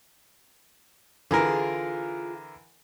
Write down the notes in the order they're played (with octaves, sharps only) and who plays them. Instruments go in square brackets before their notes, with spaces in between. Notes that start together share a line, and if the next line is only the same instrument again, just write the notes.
[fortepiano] D3 E3 A#4 [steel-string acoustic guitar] F4 G#4